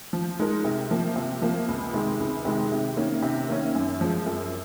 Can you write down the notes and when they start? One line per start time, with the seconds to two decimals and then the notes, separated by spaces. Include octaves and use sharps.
0.13 F3
0.39 G#3 D#4 A#4
0.64 C3
0.91 F3 A#3
1.16 C3
1.42 F3 A#3
1.68 C#2
1.93 C3 D#3 G#3
2.20 C#2
2.45 C3 D#3 G#3
2.72 C3
2.97 D#3 A#3 C#4
3.22 C3
3.49 D#3 A#3 C#4
3.75 F#2
4.01 F3 G#3
4.26 F#2